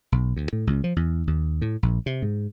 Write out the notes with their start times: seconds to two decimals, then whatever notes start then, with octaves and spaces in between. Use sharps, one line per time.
0.12 B1
0.36 D2
0.53 A2
0.67 C#2
0.84 F3
0.96 E2
1.27 D#2
1.62 A2
1.83 A#1
2.06 C3
2.22 G#2